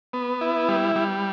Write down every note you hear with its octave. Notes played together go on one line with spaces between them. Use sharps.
B3
E4
G3
G3